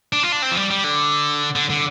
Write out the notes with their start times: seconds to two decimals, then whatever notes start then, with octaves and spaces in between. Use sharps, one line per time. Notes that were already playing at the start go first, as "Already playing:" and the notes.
0.13 D4
0.23 F4
0.32 D4
0.42 C4
0.52 F3
0.57 G3
0.71 G3
0.84 D3
1.56 D3
1.70 D3